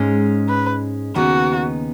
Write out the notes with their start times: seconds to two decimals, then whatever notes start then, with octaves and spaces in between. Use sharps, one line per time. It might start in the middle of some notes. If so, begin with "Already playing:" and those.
Already playing: G#2 G#3 C#4
0.49 B4
1.15 D#2 C#3 B3 D#4 F#4